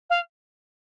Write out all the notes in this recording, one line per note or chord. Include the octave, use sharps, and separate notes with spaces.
F5